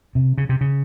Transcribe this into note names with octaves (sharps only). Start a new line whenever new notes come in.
C3
C#3
C3
C#3